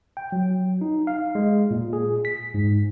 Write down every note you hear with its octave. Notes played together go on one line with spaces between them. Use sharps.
G5
F#3
D#4
F5
G#3
A#2
G#4
B6
G#2